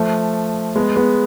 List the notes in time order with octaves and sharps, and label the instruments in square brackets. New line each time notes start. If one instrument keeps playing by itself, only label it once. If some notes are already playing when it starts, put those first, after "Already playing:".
Already playing: [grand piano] F3 A3
G#3 B3
G#3 B3